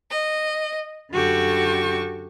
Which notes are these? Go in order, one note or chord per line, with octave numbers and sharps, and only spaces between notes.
D#5
F#2 D3 F#4 G4 A4 C#6